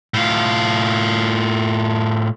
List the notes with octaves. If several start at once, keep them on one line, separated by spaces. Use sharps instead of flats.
A2 F4